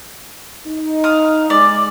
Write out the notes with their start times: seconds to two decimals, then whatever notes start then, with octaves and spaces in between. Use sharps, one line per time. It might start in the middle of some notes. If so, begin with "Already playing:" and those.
0.66 D#4
1.04 F5 D#6
1.50 G#3 D5